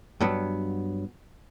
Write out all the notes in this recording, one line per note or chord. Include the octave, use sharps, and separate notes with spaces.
G2 F#3 B3